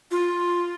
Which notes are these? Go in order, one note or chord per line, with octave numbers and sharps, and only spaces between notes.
F4